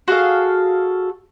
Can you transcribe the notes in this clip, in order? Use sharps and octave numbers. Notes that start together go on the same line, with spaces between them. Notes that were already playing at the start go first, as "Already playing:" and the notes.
F#4 G#4 A4 F5